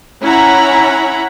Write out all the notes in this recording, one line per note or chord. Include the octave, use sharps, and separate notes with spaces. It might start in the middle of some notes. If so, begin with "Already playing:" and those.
C#4 E4 F#5 A#5 B5